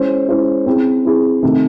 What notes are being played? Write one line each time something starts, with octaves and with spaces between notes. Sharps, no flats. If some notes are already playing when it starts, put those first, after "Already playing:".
Already playing: G#3 C#4 E4 C5
G#3 C#4 E4 C5
C4 E4 G#4
C4 E4 G#4
C3 D#3 A3 C4